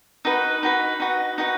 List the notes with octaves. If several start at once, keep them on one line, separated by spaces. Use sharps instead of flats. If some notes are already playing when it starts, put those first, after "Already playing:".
D#4 F#4 B4
D#4 F#4 B4
D#4 F#4 B4
D#4 F#4 B4